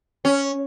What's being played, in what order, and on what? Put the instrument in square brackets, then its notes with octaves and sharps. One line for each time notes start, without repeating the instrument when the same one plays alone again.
[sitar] C#4